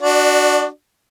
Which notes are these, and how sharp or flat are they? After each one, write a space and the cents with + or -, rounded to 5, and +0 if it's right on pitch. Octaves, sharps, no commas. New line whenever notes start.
D4 +0 F#4 +0 D5 +30